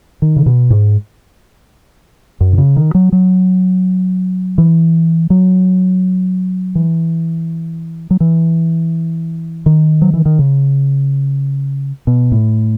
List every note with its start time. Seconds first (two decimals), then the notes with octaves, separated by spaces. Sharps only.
0.22 D#3
0.36 C#3
0.46 B2
0.70 G#2
2.41 F#2
2.53 B2
2.58 C#3
2.76 D#3
2.95 F#3
3.12 F#3
4.58 E3
5.30 F#3
6.75 E3
8.11 F#3
8.20 E3
9.66 D#3
10.02 F#3
10.14 E3
10.26 D#3
10.39 C#3
12.07 B2
12.32 A2